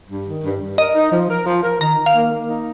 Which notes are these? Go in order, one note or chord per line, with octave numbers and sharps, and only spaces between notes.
G2
D#3
G2
G2
A#4 D#5
D#4
F3
A#4
F3
A#4
D#3 A#5
D#3
F5
A#3
A#3
D#4